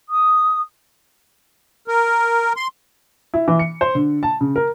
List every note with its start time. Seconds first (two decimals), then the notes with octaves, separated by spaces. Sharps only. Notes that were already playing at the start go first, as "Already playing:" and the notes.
0.09 D#6
1.88 A#4
2.56 C6
3.34 E4
3.48 E3
3.59 C#7
3.81 C5
3.95 D3
4.23 A5
4.41 C#3
4.56 A#4